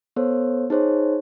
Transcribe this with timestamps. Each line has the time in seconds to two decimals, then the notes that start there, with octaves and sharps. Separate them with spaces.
0.16 B3 A4 C5 C#5
0.70 D#4 G#4 C5 C#5